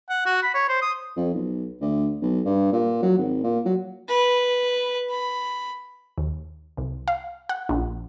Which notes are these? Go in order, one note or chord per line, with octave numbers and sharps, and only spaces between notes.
F#5
F#4
B5
C#5
C5
D#6
F2
B1
D2
B1
G2
A#2
F#3
G#1
A#2
F#3
B4
B5
D#2
C2
F5
F#5
A#1